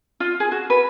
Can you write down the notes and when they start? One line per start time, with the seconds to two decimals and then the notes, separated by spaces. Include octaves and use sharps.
0.20 F4
0.40 G#4
0.52 F#4
0.70 B4